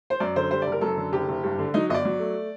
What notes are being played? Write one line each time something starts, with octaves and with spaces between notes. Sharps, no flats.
C5
F#2 D5
D3 C5
G3 C5
D5
F#1
A#4
F#2 A4
D3
F#1 G4
F#1
G2
D3
F#3 D#4
G1 D#5
D5
F#3
A3